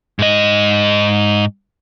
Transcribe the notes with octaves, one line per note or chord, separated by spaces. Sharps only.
G#2 D#5